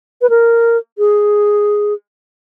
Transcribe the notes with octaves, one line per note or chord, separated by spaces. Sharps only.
B4
A#4
G#4